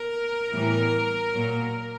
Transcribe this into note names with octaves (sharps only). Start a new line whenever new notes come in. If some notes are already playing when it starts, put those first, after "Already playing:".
Already playing: A#4
A2 E3 G3 B3
A#2 F#3 A#3